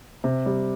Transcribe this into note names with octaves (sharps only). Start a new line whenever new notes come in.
C3
G3